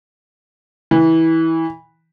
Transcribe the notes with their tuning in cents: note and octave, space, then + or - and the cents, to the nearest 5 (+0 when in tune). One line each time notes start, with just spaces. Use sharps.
E3 -20